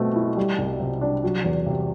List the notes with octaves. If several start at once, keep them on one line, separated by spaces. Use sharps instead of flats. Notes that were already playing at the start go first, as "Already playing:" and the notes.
Already playing: B2 A3 C4
E4
G3
C2
C3
D4
F#3
E2
C3